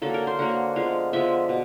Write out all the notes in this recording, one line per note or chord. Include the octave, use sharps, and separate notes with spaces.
D3 F#3 A#3 A4
A#4
C5
D3 F#3 A#3 F#5
D3 F3 G#3 B3 F5
D3 F3 G#3 B3 E5
B2